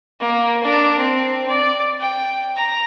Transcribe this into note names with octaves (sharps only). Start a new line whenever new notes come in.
A#3
D4 A#4
C4
D5
G5
A#5